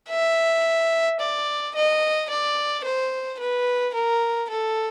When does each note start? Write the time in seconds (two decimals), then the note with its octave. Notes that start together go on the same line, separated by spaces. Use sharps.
0.10 E5
1.20 D5
1.75 D#5
2.30 D5
2.84 C5
3.39 B4
3.94 A#4
4.50 A4